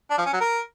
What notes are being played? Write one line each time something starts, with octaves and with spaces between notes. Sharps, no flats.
D4
F3
C#4
F#3
A#4